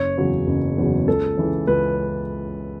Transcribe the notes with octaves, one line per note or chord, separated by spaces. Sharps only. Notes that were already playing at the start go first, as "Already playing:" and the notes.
Already playing: F#1 C#5
E2 C#3 F#3
F#1
E2 C#3 F#3
C#2 A4
C#3 E3
C#2 B4